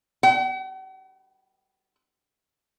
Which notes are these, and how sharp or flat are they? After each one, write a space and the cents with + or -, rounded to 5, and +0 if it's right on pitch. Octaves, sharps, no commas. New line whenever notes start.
F#5 +45